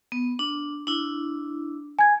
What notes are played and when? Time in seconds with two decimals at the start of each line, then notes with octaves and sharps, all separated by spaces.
0.12 B3
0.39 D4
0.87 D4 E4
1.99 G#5 G#6